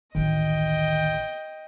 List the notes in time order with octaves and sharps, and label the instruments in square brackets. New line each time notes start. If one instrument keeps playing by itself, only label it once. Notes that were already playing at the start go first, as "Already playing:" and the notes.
[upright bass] A1 D2 [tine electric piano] D#3 [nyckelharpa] D#5 G5